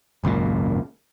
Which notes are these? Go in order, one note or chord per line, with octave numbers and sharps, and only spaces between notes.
G#1 C#2 F#2 A#2